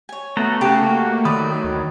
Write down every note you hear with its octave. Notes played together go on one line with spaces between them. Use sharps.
C#5 G#5
A3 B3 F#4 A4 A#5
C#3 F#4 G4 C#5 A5
A#3 F#4
D#3 F#3 D5 B5 D#6
D2